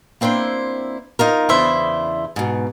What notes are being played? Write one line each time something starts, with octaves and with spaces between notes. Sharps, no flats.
A#3 C4 D4 E4 C5
D#4 F4 A#4
E2 C#3 D4 E4 C5 E5
G#2 B2